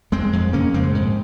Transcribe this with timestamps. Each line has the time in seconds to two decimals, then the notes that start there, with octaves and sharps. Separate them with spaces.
0.12 F2 G#3 C4
0.33 F2
0.53 C#3 A#3 C#4
0.74 F2 G#3 C4
0.94 G#2